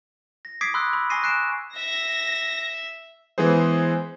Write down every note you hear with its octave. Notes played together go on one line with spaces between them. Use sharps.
A#6
D6 D#6 G#6 B6 C7 D7
B5 C6 D#6 E6 F#6
B5 D6
G#5 C#6 D#6 A#6 C7 D#7
F#6 C7 D7 E7
E5 A#6
E3 G#3 B3 G#4 C5